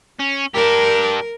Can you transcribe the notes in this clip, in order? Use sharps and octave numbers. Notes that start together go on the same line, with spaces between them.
C#4
D4 G4 A#4